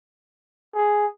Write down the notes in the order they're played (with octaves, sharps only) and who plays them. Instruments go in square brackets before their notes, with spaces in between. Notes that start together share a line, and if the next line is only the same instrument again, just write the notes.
[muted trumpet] G#4